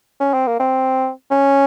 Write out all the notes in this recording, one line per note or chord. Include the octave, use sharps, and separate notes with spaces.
C#4
C4
A#3
C4
C#4